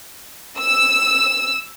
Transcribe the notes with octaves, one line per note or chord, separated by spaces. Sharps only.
E6